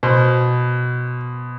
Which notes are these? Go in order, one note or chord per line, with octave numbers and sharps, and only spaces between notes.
B2 C5